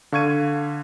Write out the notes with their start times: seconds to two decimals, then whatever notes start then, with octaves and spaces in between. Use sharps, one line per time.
0.12 D3 F5 C#6 G#6 D#7